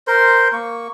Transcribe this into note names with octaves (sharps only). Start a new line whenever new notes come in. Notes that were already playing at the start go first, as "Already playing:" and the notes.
A#4 C5 C6
A#3 C#6